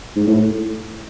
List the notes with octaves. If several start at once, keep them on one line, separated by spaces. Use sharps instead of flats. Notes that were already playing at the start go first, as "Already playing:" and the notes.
G#2
A2